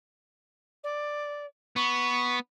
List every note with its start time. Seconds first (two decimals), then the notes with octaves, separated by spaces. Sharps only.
0.83 D5
1.76 B3 C#6